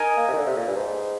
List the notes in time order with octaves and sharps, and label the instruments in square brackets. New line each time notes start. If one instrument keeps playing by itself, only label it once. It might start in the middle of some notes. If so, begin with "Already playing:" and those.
Already playing: [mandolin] D#4 A#4 D#5 G#5
[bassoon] A#3
C3
D#3
D3
C3
A#2
G2
G#2